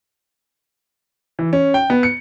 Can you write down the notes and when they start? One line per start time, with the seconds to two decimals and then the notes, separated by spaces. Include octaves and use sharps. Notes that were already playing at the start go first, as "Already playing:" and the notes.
1.39 E3
1.53 C#4
1.74 G5
1.90 B3
2.03 C#7